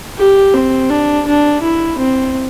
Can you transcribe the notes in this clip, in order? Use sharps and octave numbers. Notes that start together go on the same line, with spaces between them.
G4
C4
D4
D4
E4
C4